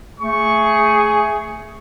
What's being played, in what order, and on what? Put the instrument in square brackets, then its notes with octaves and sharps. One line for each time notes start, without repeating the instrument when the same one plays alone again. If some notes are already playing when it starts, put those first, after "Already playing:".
[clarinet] A3 [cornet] G#4 [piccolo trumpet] C#6